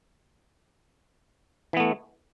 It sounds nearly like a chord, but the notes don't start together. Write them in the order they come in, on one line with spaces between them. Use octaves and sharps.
E3 B3 A3